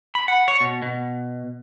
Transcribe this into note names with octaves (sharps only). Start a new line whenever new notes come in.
B5
F#5
C#5
B2
B2